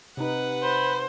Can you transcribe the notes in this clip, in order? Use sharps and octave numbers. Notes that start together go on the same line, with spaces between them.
C3 D#4 B4 F#5
C5 B5